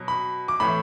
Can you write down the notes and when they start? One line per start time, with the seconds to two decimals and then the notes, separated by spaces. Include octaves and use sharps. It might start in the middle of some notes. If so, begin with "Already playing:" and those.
Already playing: B2 F#3
0.08 B5
0.48 D6
0.60 A2 E3 B5